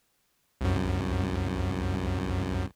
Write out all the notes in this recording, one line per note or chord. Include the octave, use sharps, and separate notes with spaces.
C2 F#2